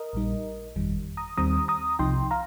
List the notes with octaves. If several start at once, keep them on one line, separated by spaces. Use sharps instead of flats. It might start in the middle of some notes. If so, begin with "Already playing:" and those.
Already playing: A#4 D#5
A#1 A#2 G3 D#4
G1 F2 D#3 G3
A#5 D#6
D#2 D#3 G3 C4 A#5 D#6
A#5 D#6
C2 C3 F3 D#4 G5 C6
F5 A#5